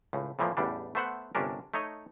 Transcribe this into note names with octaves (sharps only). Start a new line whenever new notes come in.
C#2 A2
F2 A2 E3 F3 A#3
A1 E2 G3 D4
A3 B3 C5 E5 F#5
G1 C3 C#4 D4 A#4
A3 D#4 C#5 D#5